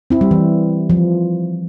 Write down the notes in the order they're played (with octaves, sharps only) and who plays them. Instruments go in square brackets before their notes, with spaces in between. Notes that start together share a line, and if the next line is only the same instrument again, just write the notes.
[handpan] C4 E4
G3
E3
F3